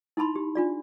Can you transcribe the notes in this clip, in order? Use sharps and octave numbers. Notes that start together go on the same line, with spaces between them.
D#4 E4 A5 B5 C6
G4
D4 F4 D5